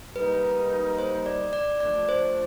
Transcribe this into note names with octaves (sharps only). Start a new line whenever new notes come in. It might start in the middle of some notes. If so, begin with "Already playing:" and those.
G3 A#3 D#4 B4
C5
D5
D5
F3 A3 D4 D5
C5